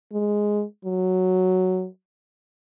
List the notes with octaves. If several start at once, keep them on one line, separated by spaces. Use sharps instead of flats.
G#3
F#3